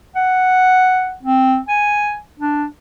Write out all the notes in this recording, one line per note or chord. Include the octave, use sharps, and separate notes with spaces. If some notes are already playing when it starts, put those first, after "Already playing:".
F#5
C4
G#5
D4